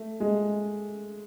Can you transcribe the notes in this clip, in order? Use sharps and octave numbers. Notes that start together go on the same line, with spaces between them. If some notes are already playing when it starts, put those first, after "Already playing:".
Already playing: A3
G#3